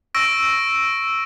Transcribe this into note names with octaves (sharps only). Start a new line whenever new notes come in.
C#6 E6 A#6 D7